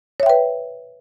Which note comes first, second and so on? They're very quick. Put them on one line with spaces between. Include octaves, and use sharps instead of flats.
C#5 E5 G5 B4